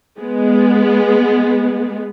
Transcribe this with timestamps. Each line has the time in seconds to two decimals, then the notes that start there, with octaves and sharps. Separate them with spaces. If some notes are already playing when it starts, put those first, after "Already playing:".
0.19 G#3 B3